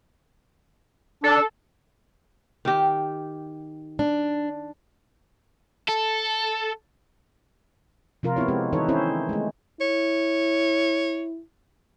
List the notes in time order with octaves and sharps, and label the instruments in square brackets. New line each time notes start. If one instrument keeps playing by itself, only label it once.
[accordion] D4 [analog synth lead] A4
[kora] D#3 G4
[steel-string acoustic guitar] D4
[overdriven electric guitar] A4
[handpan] C3 F3 F4 A#4
B3 C4 E4 C#5
G#3 C4 G4
D#3 E3 D#4 A4 B4 C#5
C4 C#4 E4 A4 C5
G#3 A3
[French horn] E4 [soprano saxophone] C#5